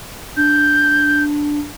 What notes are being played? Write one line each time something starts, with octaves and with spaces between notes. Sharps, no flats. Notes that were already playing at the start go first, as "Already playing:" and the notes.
D4 G6